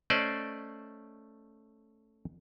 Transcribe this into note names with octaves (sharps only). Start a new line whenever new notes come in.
A3 C#4 C5 D5 D#5